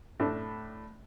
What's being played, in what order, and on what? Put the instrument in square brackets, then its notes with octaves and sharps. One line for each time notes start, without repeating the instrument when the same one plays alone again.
[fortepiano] A2 A3 D4